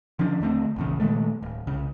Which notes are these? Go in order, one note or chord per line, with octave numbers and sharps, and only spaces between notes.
D3 F3 C#4 D4
D#2 D3 A3 C4
A#1 E2 C#3
A#2 D#3 G#3 A3
D1
C2 C#3